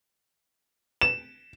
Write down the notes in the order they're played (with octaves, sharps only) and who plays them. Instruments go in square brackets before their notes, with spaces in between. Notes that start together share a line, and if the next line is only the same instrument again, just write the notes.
[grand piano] E7